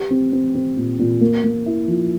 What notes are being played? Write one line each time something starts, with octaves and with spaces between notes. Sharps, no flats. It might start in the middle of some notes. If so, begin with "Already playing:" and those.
Already playing: G4
C4
C4
C4
A#2
A#2
A#3
A#3
E4
F3